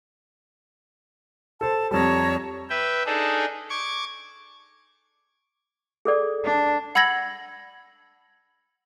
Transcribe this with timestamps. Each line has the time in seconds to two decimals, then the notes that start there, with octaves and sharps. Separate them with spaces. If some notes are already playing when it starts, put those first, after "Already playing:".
1.61 A4 C5 A5
1.91 F2 G3 C#5 A5 A#5
2.70 B4 E5 G5
3.06 D4 D#4 G#4 A4
3.70 C#6 D6 G#6
6.05 G#4 A4 D5
6.45 D4
6.95 F#5 B5 E6 G#6 A#6 F#7